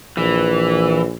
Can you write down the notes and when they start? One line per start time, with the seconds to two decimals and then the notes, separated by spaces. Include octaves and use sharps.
0.17 A#1 E3